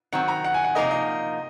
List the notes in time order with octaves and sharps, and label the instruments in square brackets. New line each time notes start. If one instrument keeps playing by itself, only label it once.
[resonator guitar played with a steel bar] D#3 F#3 C4 [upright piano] F#5
[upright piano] A#5
F#5
G#5
F#5
[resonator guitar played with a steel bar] C3 F3 A#3 D#4 A#4 [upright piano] D#5
[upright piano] D#5